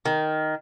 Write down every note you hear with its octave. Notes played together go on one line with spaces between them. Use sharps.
D#3